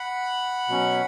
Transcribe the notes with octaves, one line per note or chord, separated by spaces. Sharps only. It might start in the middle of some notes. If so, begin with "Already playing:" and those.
Already playing: F#5 B5
B2 F#3 C#4